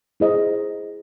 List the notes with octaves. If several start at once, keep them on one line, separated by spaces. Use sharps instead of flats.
E4 G#4 C5 D#5